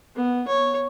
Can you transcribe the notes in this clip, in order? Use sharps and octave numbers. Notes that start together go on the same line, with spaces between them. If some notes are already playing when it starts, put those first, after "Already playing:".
B3
C#5